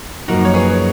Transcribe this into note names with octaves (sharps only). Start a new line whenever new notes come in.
F#2 C#3 F3 A#3 D#4 F#4 A#4
C#5
G#4 B4